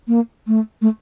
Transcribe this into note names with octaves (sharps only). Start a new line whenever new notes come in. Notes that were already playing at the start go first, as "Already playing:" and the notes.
A#3
A3
A3